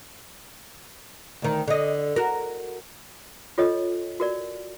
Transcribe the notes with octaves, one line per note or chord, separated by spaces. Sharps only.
D2 D#3
D3 D#5
F#4 A#4
F4 A4 C#5 D#5
F#4 A#4 D5